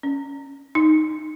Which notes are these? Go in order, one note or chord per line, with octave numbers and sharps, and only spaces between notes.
C#4
D#4